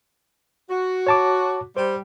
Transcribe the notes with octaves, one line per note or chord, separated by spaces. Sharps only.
F#4
C#5 A5 D6
G3 C5